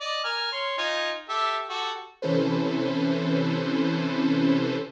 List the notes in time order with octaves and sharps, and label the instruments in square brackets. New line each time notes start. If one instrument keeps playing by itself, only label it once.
[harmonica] D5 D#5
A#4 G#5 F6
C#5 C6
D#4 F4 G#5
G4 A4 E5
F#4 G4 A4
[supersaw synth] C3 E3 C#4 A4 B4 C5